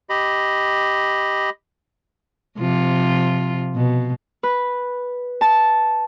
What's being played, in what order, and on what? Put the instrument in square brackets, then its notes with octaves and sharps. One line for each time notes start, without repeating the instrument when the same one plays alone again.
[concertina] G4 D#5 B5
[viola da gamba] C3 F3 F4
B2
[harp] B4
A5